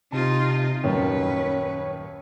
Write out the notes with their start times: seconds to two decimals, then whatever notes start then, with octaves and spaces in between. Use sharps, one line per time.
0.12 C3 D#4 F4 A5
0.83 D#1 F#2 D#3 C#4 B4 C#5